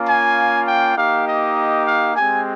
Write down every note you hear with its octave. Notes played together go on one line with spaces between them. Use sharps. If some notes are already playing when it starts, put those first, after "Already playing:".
Already playing: A#3 C#4 F4
G#5
G5
A#3 D#4 G4 F5
D#5
F5
G#3 C4 G4 G#5